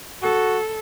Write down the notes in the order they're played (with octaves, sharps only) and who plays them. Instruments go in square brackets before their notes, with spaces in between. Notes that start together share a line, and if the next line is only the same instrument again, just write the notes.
[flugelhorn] F#4 [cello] A4